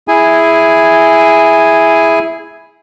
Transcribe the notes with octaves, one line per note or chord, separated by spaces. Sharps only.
E4 G#4 G#5